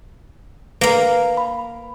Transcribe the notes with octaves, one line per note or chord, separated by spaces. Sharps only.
A#3 B4 F5
B5